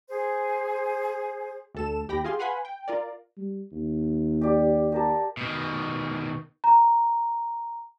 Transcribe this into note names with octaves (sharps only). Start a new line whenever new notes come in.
G#4 C5
D2 A4 E7
D#2 G4 G5 B5 A#6
F4 G4 G#4 F5 C6
B4 F5 F#5 G#5 B5 C6
G5
F4 A#4 D5
G3
D#2
G4 D5
G4 A#4 A5
B2 D#3
A#5